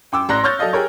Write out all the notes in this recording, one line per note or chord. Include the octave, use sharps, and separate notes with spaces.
F#2 G5 D6 E6
A1 D5 A#5 C6 F#6 A#6
C#5 C#6 F6 G6 A6
F#3 A4 D5 D#5 F5
G4 G#4 A#4 C#5